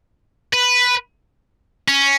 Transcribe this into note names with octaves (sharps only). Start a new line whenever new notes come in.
B4
C#4